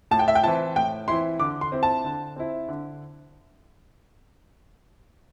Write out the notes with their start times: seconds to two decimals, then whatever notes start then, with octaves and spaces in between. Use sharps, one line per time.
0.11 A2 A5
0.19 G5
0.28 E5
0.35 G5
0.43 E3 C4 E4 A5
0.76 A2 G5
1.08 E3 C4 E4 C6
1.39 D3 D6
1.61 C6
1.72 C4 E4
1.83 A5
2.04 D3
2.36 C4 E4
2.69 D3